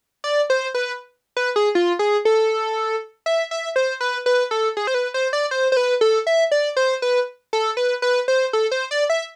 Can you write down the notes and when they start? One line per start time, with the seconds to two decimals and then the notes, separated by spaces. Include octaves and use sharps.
0.24 D5
0.50 C5
0.74 B4
1.37 B4
1.56 G#4
1.75 F4
1.99 G#4
2.25 A4
3.26 E5
3.51 E5
3.76 C5
4.01 B4
4.26 B4
4.51 A4
4.77 G#4
4.87 C5
4.94 B4
5.14 C5
5.33 D5
5.51 C5
5.72 C5
5.77 B4
6.01 A4
6.27 E5
6.52 D5
6.77 C5
7.02 B4
7.53 A4
7.77 B4
8.02 B4
8.28 C5
8.53 A4
8.71 C5
8.91 D5
9.10 E5